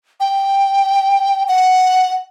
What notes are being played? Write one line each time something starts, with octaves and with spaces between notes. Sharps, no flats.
G5
F#5